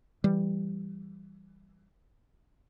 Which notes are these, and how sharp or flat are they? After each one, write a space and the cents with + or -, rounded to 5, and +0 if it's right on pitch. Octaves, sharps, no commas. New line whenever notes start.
E3 +20 G3 +5